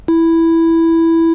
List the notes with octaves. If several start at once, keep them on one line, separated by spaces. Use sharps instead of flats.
E4